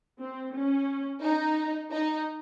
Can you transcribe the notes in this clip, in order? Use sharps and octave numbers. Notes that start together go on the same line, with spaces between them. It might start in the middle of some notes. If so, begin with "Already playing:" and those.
C4
C#4
D#4
D#4